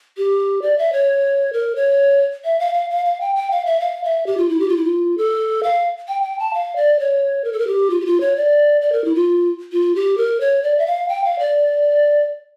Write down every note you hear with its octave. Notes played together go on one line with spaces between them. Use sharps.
G4
D5
E5
C#5
A#4
C#5
E5
F5
F5
F5
F5
G5
G5
F5
E5
F5
E5
G4
F4
E4
G4
F4
E4
F4
A4
F5
G5
G5
A5
F5
D5
C#5
A#4
A4
A#4
G4
F4
G4
F4
C#5
D5
D5
A#4
E4
F4
F4
G4
A#4
C#5
D5
E5
F5
G5
F5
D5